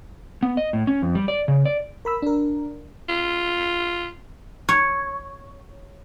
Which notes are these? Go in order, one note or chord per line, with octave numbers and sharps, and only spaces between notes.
B3
D#5
A2
C#4
F2
G3
D5
C#3
D5
A#4 B5 E6
D4 A#4
F4
C#5